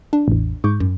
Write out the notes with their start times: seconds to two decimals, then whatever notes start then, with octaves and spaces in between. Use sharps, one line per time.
0.13 D4
0.28 A1 E2
0.64 G#2 C#6 D6 G6
0.80 F#2